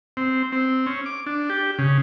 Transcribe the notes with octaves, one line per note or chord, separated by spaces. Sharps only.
C4
C4
C#4
D6
D4
G4
C#3